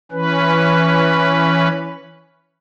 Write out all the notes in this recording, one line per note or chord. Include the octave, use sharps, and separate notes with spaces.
E3 C#4 B4